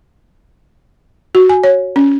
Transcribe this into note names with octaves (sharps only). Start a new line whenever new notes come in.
F#4
G#5
C#5
C#4